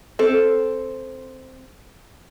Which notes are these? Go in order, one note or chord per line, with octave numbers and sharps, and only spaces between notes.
C4 A4